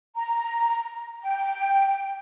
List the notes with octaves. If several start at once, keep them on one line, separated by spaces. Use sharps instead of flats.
A#5
G5